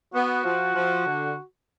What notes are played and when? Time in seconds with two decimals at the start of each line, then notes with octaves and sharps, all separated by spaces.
0.14 B3 F#4
0.45 F3
0.75 F3
1.06 D3